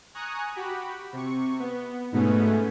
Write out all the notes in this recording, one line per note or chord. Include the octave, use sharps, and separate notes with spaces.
G#5 A#5 C#6 D#6 F#6
F#4 G4 B5
C3 C#6
B3
G#2 B2 A3 B3 C#4